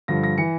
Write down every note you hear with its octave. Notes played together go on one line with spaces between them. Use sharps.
G2 D3 F3 A#6
A#6
E3 C#7